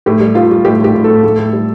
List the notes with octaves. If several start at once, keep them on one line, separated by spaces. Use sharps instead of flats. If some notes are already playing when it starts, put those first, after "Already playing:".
A2 G4
G3
G3 F4
G3
A2 G4
A2 G4
A2
A4
A2
A2
A2
G3